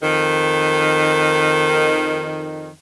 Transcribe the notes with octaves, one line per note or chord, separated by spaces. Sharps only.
F2 D#3